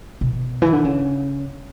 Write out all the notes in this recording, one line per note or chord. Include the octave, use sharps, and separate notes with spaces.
B2
E3
D3
C#3